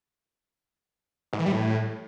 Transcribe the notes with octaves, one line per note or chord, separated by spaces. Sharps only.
G#2
E3
G3
A2